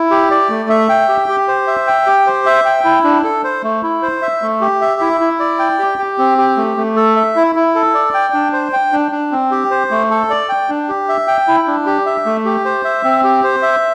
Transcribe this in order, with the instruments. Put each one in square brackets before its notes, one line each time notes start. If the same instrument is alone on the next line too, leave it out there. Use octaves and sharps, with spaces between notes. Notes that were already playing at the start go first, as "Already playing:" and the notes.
Already playing: [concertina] E4
G4
D5
A3
E5
G5
G4
G4
C5
E5
G5
G4
C5
E5
G5
E4
D4
A4
C5
A3
E4
C5
E5
A3
G4
E5
E4
E4
D5
G5
G4
G4
C4
G4
A3
A3
A4
E5
E4
E4
A4
D5
G5
D4
C5
G5
D4
D4
C4
G4
C5
A3
A4
D5
G5
D4
G4
E5
G5
E4
D4
G4
E5
A3
G4
C5
E5
C4
G4
C5
E5